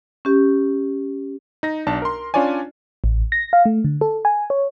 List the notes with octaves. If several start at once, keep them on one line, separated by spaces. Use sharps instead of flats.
C#4 G4
D#4 A#6
B1 D4 A5
A#4 C6
C#4 D4 F4 C#5 D5 G#5
A1
A#6
F5
A3
D3
A4
G#5
C#5